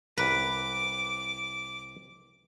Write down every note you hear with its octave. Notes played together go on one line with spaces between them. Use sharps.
C2 A#4 B4 D6